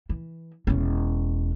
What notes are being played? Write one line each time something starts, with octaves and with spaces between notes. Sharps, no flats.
E3
E1 C#4